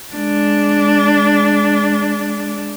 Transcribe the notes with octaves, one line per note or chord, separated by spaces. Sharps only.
G#3 D4